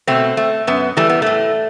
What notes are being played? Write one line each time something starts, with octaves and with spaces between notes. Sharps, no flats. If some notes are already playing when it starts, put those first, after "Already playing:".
B2 A3 C4
A3
F#2 B3
E3 G3 A3
B3
A2 A3